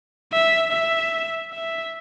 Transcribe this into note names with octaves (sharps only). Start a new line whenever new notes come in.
E5
E5
E5